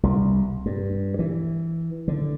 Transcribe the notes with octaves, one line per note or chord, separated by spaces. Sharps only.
C2
G2
E3
D3